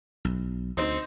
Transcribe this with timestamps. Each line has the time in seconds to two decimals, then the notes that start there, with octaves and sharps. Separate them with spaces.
0.25 B1
0.77 D2 C4 D#4 C5